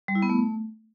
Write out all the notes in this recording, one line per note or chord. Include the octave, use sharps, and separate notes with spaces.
G3
E4
B3
A3